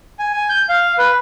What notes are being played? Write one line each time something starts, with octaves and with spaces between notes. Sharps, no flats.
G#5
G#5
G6
F5
B4